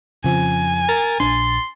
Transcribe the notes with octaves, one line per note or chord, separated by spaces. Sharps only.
F2 C#3 F3 G#5
A#4 A6
A#1 D4 C6